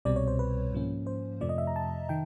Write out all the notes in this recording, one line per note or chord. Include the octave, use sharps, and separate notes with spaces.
C2 B2 G3 C4 D5
C#5
C5
B4
G#2 F3 A#3 C#4
C5
F2 C3 F3 A3 D5
D#5
E5
A#5
A5
D#3 G5